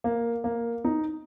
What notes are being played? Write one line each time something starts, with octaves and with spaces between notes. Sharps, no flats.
A#3
A#3
D#4